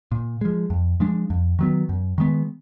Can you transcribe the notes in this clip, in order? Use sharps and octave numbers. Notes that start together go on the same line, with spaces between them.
A#2
F3 G#3
F2
F3 G#3 D4
F2
D#3 F#3 B3
F#2
D#3 G#3 B3